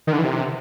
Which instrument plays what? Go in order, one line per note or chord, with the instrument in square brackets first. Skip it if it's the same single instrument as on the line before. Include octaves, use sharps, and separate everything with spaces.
[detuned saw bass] D#3
D3
E3
C3